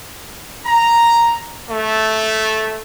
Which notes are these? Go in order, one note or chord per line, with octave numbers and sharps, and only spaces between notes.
A#5
A3